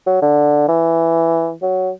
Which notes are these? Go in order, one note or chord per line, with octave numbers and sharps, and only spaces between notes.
F#3
D3
E3
F#3